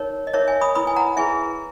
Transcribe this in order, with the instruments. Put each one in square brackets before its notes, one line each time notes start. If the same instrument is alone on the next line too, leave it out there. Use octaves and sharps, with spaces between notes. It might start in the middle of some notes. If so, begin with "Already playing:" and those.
Already playing: [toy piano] D#4 A#4 C#5
D#5
D#4 A#4 C#5 E5
E5 G#5
B5 D#6
E4 B4 B5 D#6
G#5
F#5 A#5
E4 G#4 B4 E5 G#5